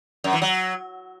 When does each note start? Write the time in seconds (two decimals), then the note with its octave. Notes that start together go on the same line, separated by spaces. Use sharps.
0.24 F#2
0.33 E3
0.42 F#3